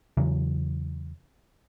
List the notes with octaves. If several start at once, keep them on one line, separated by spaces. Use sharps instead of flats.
E2 C#3 E3 F#3